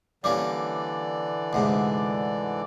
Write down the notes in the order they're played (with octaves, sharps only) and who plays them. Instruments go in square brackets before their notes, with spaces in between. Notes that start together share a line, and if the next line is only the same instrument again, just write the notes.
[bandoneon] D3 E3 D5 [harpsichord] G3 A#3 C#4
[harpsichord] D2 G#2 C3